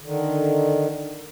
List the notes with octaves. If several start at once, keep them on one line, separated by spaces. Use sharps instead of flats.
D3 D#3